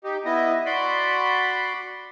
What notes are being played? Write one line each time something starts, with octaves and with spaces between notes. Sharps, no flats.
D#4 G4
B3 E4 D#5
F#4 D5 B5 C6